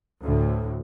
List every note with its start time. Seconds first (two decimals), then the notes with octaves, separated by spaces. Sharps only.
0.24 D2 A2